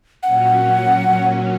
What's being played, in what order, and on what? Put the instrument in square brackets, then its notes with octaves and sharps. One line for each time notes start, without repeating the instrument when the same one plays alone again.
[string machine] A#2 F#3 C#4 [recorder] F#5